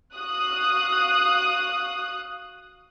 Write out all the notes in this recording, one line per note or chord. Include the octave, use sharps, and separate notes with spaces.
F#4 F5 D#6 F#6